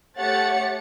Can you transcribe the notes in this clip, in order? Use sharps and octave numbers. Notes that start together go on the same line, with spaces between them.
A3 G4 C#5 F#5 A6 C#7